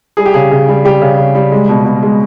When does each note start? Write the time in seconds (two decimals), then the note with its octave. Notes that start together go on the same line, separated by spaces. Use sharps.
0.17 G3 G#4
0.26 G4
0.34 C#3 G#4
0.51 C#3
0.68 G3
0.85 G3 G4
1.02 C#3
1.18 C#3
1.35 G3
1.52 G#3
1.69 B2
1.85 B2
2.03 G#3